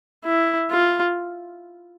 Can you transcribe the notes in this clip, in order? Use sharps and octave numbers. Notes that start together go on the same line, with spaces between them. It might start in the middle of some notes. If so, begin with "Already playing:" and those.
E4
F4